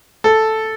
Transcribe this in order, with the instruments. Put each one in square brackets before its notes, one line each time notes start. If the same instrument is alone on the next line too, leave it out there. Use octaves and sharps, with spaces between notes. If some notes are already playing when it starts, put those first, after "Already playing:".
[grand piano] A4